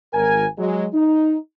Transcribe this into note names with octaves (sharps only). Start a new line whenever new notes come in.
G#1 A#4 G#5
F#3 G#3
D#4